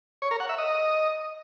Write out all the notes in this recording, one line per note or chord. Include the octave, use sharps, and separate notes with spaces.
C#5
A#4
F#5
E5
D#5